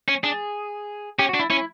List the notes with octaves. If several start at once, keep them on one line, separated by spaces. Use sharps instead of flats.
C#4
D4 G#4
C#4 G4
F#4
D4
E4
C#4 E4